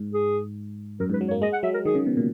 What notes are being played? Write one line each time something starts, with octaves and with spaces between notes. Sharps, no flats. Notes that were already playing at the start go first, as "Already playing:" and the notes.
Already playing: G#2
G#4
F#2 A#4
G#2 B4
F#3
C#5
A#3
G#3 D#5
F#5
F#3 E5
A#4
D#3 G#4
C#3
B2
A#2